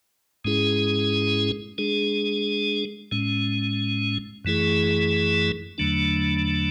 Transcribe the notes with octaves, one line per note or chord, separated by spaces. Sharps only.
G#2 G#3 C#4 E4 G#4
G#3 D4 G#4
A2 G#3 C#4
F#2 E3 A3 E4 G#4
E2 D3 F#3 A3 D4